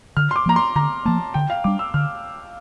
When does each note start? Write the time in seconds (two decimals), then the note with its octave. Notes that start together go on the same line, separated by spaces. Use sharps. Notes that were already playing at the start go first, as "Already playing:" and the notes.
0.17 D3 F6
0.31 C6
0.36 D6
0.46 F3 A#3 A#5
0.56 C6
0.75 D3 A#5
1.05 F3 A#3 A5
1.34 D3 G5
1.50 F5
1.64 G3 D4 D6
1.79 E6
1.94 D3 F6